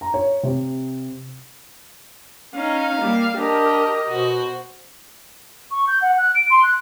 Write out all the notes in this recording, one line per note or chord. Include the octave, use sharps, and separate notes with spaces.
A#5
C#5
C3
C#4 D#4 F5
G3 A#3
D4 G4 A#4 D#5
B2 F#4 C5
C#6
G6
F#5
F#6
D7
C6
F#6